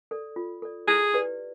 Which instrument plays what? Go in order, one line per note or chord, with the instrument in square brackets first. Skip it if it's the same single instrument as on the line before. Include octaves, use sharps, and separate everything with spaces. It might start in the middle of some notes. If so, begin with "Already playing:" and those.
[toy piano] A4 D5
F4
A4 D5
[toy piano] E4 [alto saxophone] G#4
[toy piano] G4 B4 D5